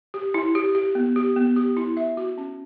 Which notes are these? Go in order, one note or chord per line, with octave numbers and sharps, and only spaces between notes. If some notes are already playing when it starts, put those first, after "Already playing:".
G4
E4
G4
G4
B3
G4
B3
G4
E4
E5
F#4
C#4